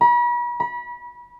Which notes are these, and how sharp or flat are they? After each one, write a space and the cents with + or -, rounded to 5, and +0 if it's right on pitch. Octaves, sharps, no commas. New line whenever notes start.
B5 -40
B5 -30